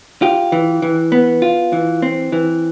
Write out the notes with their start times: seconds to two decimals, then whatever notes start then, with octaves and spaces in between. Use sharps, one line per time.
0.22 F4 G4
0.52 E3
0.82 E3
1.12 B3
1.42 F4
1.73 E3
2.02 C4
2.32 E3